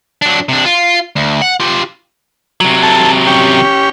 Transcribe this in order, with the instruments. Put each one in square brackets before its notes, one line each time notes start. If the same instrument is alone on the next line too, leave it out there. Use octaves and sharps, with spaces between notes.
[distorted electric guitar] F#3 D4
C3 D4
F4
D2
F#5
F4 G4
C3 F#3
[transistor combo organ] A4 A5
C#4 G4